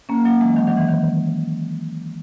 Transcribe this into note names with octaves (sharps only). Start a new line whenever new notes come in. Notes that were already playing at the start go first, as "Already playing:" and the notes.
A#3 C#4
F#3 A#3
E3 G#3
D#3 F#3
D#3 F#3
E3
D#3